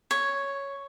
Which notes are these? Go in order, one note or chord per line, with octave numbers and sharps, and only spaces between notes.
C#5